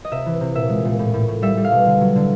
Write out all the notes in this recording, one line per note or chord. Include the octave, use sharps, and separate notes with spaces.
D#5
C3 E5
E3
C3
A#2 E5
G#3
A#2
A2
A2
A2
G3 E5
G3
F5
B2
D3
F#3
D3